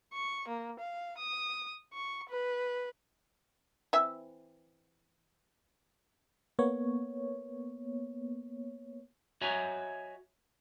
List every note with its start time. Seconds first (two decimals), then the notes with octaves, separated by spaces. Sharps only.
0.13 C#6
0.48 A#3
0.79 F5
1.18 D#6
1.93 C#6
2.29 B4
3.93 E3 C4 E5
6.59 A#3 B3 C#5
9.41 F#4 C#5 D#5 E5 G#5 A#5